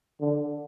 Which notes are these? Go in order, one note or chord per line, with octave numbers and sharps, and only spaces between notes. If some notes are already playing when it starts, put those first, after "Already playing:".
D3